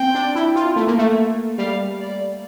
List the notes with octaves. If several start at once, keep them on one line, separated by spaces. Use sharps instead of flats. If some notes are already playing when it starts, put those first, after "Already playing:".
Already playing: C4 G5
D4
E4
F4
A3
A#3
A3
G3 F5
D5